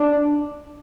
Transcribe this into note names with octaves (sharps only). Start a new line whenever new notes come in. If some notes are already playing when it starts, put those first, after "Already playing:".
Already playing: D4